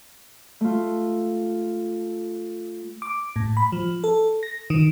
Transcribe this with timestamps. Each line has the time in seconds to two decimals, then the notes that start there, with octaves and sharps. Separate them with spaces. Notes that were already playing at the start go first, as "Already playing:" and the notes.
0.61 A3 F4
3.02 D6
3.36 A2
3.57 B5
3.72 F3
4.04 A4
4.43 A#6
4.70 D#3